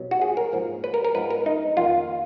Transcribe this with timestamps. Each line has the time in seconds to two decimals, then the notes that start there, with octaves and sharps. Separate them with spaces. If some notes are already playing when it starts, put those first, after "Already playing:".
Already playing: B2 F#3 B3
0.11 F#4
0.22 G#4
0.37 A#4
0.52 G#2 F3 A#3
0.84 B4
0.94 A#4
1.05 A#4
1.15 G#2 F3 G#3 B3 B4
1.31 A#4
1.46 D#4
1.77 F2 D#3 A#3 F4